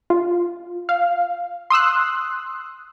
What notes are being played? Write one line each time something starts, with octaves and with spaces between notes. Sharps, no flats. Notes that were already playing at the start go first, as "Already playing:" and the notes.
F4
F5
C6 D#6 E6 F#6